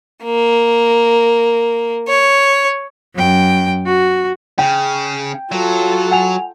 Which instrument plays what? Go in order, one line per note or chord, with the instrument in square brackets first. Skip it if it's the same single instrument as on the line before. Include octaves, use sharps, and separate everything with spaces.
[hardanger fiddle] A#3
C#5
[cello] F#2 G5
F#4
[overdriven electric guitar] C#3 [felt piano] G5
[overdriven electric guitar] F#3 [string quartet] F4 A4
[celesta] F#5 G#5 F7